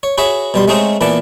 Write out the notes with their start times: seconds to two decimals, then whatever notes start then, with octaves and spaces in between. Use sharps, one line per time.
0.03 C#5
0.18 F#4 G#4 B4 C#5 E5
0.54 B2 G3 C6
0.68 G#3 A3 C4 C#4 D#4 G#4
1.01 A#2 E3 B3 A5 D6